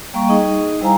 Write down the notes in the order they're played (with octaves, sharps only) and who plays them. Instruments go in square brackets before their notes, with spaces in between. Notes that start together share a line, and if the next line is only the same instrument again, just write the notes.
[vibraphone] G3 A#3 F5 G5 C#6
D#4 G#4 D#5
G3 E4 C5 F5 G#5 A#5